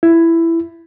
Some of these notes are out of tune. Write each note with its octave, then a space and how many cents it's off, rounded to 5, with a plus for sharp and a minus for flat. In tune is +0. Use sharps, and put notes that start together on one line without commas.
E4 +10